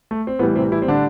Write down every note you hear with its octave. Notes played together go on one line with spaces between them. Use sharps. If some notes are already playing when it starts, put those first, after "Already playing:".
A3
C4
A2 E3 G3 B3
C3 C4
E3 E4
C4
D3 D4